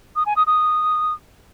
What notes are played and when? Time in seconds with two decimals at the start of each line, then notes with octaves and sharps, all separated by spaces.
0.16 D#6
0.26 G#5
0.36 D#6
0.47 D#6